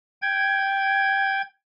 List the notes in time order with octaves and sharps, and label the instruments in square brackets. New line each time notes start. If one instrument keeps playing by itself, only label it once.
[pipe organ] G5 G#6